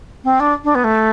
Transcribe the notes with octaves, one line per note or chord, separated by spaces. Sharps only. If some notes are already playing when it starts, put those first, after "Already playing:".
C4
D4
D4
B3
A3